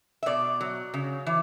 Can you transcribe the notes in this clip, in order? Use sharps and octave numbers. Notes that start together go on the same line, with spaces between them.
E5
B2 D5
F#3
C#3
E3